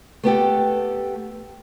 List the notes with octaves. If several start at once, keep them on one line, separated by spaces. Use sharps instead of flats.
A3 B3 G4 A4